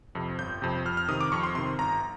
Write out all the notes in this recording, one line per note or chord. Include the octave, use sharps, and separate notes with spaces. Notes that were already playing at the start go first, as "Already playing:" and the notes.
F2 C3
G1 G6
F2 C3
F2 F6
F6
C3 D#3 D#6
D6
F2 C#6
C6
C3 D#3 C6
G1 A#5